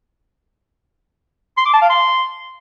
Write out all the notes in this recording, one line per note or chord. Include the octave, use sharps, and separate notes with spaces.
C6
D6
A5
F5
C6